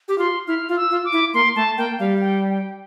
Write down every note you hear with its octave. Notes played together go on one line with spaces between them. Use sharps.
G4
F4 C6
E4 F6
F4
E6
F4
D6
E4
A#3 C6
A3 A5
A#3 G5
G3 F5
G5
G5